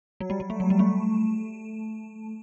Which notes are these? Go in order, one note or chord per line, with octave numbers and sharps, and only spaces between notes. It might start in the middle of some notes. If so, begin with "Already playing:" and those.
F#3
G3
G3
A3
F#3
G3
A3